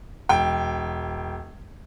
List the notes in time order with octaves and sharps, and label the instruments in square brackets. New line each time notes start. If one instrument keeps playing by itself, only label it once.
[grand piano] E1 G5